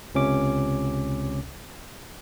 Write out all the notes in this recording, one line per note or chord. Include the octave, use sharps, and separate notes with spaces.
C#2 C3 C#4 D6